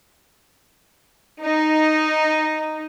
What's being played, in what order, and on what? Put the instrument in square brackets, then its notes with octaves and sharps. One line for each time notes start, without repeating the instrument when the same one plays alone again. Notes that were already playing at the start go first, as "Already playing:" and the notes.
[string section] D#4